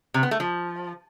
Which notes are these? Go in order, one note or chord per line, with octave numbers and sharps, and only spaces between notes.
C3
B3
A3
F3